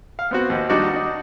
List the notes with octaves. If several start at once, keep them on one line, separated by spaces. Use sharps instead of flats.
F5
B3 C4 F#4
D#2
G3 D4 D#4 F#4 D5
D#4